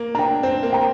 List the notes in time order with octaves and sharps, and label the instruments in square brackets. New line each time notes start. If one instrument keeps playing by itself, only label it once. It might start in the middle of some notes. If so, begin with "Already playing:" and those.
Already playing: [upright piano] A#3
[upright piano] D4 [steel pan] G5 A#5
[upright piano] C4 [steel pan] C5
[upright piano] A#3
[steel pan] G5 A#5